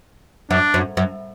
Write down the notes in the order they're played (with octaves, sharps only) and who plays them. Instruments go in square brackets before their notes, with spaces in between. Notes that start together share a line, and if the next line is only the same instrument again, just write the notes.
[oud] F#2 [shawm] D4
[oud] F#2
F#2